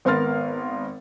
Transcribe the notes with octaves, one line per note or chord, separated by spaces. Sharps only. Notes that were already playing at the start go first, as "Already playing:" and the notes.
G#1 B3 A#4 C6 F6 A6